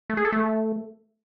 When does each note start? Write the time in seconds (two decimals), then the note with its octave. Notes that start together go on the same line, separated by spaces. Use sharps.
0.10 A3
0.17 G#4
0.25 A4
0.32 A3